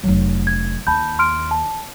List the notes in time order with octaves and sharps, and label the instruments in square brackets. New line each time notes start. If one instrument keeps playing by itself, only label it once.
[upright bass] F1 F#3
[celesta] G#6
[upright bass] D#2 [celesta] A5 B5 G6
[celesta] C6 F6 D7
A5